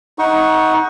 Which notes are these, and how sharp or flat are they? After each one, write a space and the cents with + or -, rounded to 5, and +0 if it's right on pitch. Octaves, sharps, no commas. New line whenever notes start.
D#4 +25 F#5 +0 C#6 +0